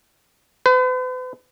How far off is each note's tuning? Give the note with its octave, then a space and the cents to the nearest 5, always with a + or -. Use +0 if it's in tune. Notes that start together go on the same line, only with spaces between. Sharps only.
B4 +45